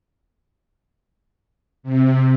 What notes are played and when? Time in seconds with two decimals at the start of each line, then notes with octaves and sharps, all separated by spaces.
1.83 C3